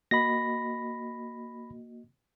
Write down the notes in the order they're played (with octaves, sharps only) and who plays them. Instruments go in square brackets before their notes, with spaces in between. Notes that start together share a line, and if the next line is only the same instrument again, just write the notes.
[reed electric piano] A#3 F#4 D#5 [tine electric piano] B5 A#6